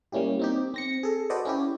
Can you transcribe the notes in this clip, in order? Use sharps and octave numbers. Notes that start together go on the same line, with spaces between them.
G3 A#3 C#4 E4 G4
C4 D#4 G4
C4 A#6 C#7
G#4 A4
F#4 A4 B4 C5 D5 D#5
C#4 E4 G4